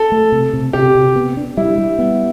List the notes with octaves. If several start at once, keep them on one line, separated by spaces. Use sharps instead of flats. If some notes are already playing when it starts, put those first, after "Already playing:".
Already playing: A4
A3
C3
C3
C3 G4
C3
B3
D4
G3 E4
G3
B3